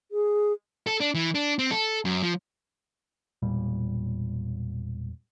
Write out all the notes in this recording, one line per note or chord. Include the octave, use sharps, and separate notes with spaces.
G#4
A4
D4
E3
D4
C4
A4
F#2
F3
E1 A#2 G3